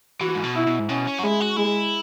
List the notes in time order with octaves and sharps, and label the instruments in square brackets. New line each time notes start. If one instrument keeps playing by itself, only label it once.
[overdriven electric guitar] E3 [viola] F#4
[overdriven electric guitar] G#2
B2
[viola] E4
[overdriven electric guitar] B2
G#2
[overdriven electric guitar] B2 [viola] C#4
[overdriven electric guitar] C#4
F#4
[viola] G#3 [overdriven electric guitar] E4
[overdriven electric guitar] F#4
[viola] G#3 [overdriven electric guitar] E4